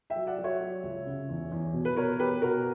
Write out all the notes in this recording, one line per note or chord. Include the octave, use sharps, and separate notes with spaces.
E5 G5
F#3
D5 F#5
F#3
C#5 E5
F#3
C#2
C#3
E2
E2
B2
B4
B2 A#4 C#5
B2 G4 B4
B2 F#4 A#4